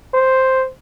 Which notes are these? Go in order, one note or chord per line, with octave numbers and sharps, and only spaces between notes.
C5